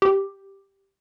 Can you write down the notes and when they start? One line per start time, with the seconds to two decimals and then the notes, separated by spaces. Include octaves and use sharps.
0.02 G4